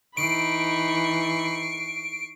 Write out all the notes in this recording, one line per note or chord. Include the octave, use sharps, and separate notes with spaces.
E3 D#4 B5 C#6 C7 D7